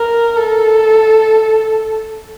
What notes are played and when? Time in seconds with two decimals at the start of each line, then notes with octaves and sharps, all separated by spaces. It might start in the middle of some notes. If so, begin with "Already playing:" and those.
Already playing: A#4
0.36 A4